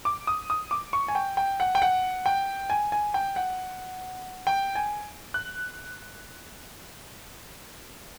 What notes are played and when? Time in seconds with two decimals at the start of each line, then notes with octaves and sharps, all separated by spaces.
0.05 D6
0.27 D#6
0.50 D#6
0.71 D6
0.93 C#6
1.08 G#5
1.15 G5
1.37 G5
1.60 F#5
1.75 G5
1.82 F#5
2.26 G5
2.70 G#5
2.92 G#5
3.14 G5
3.36 F#5
4.47 G5
4.75 G#5
5.34 F#6